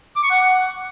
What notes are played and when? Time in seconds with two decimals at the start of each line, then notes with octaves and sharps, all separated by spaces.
0.16 D6
0.23 C#6
0.31 F#5